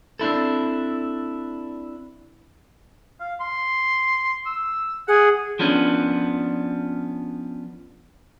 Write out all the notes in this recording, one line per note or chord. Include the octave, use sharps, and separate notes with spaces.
C4 D4 E4 A4
F5
C6
E6
G#4 F#5
F3 B3 C#4 D4